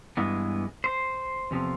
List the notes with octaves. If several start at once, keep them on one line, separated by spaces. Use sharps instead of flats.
G2 E3 G#3 B3
C5
E2 C3 F3 A3